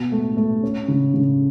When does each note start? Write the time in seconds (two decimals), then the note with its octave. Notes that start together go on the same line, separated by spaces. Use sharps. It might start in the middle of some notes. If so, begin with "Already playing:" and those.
Already playing: B2
0.12 A3
0.37 A3
0.63 C#4
0.88 C#3
1.14 C#3